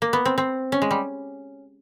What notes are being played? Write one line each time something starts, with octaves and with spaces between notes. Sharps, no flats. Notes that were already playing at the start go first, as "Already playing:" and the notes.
A#3
B3
C4
C4
C#4
G#3
G3